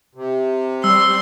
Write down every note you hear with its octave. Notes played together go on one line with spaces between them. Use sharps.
C3
G3 C6 E6